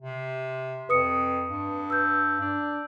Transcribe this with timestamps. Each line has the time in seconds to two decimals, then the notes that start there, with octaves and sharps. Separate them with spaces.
0.02 C3
0.89 F2 B4 D#6 C#7
1.48 G2
1.90 E6 G6
2.41 D4